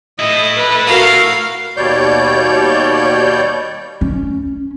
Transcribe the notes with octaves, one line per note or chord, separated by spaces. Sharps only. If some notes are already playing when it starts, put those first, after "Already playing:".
A2 E4 D#5
B4
F#4 A#4 F5
D#2 B2 G3 C#5 D5 G6
C#4